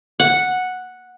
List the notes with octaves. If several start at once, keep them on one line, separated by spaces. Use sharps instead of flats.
F#5